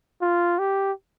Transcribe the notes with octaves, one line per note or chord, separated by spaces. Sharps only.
F4
G4